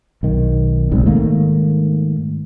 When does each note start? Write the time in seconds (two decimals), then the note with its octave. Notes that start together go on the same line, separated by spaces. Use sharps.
0.23 B1 D#3
0.91 B1 G#2 C3 G3
1.05 G#2 D#3 A3 A#3